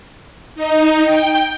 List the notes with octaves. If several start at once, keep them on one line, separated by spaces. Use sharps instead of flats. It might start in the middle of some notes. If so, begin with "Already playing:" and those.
D#4
G5